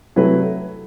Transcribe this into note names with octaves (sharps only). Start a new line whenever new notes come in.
C3 F#3 A3 E4 B4